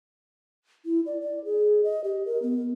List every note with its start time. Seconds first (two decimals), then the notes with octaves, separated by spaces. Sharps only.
0.85 E4
1.06 D5
1.21 D5
1.45 G#4
1.84 D#5
2.04 G4
2.25 A#4
2.42 B3